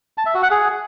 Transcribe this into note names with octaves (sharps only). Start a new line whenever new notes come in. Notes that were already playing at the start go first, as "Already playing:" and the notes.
A5
E5
F#4
F#5
G#4